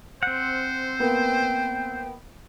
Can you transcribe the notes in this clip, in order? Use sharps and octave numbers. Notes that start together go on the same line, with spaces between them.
C4 C5 F#5
A#3 B3 G5